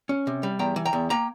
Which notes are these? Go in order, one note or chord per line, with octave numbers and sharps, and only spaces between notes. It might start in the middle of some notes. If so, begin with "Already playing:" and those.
C#4
C3
G3
E2 G5 A#5
E3
G5 A#5
E2
A#3 G5 A#5